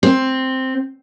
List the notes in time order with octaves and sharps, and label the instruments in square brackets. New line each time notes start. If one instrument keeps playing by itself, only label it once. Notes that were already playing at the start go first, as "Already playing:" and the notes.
[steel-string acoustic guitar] C4